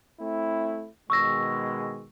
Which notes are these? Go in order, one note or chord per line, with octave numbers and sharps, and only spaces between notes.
A3 C4 E4
B2 D#3 G#3 C#6 E6 A#6